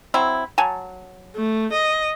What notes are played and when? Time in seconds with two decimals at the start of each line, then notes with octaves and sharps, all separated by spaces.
0.14 F#3 C4 E4
0.58 F#3 G#5 A5
1.35 A3
1.72 D#5